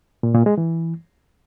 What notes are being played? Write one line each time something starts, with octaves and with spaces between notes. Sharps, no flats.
A#2
A#2
G#3
E3